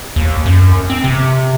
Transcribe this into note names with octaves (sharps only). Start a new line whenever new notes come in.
D#2
F#2
C4
C3